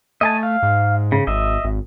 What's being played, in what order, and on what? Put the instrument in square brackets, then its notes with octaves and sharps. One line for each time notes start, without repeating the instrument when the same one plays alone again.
[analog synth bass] A3 [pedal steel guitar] D#5 G#5 A5
[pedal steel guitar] F5
[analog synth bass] G#2
[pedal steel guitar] C#3
[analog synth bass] G#1 [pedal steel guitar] D#5 E5
[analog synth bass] G#1